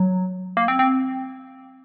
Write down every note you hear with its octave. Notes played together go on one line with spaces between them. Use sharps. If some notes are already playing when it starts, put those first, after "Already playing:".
Already playing: F#3
A#3
C4
C4